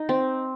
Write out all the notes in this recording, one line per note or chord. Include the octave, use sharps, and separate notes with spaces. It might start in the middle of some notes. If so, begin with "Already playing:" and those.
Already playing: D#4
C4